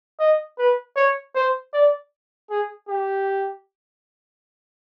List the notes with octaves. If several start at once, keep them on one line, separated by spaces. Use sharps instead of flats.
D#5
B4
C#5
C5
D5
G#4
G4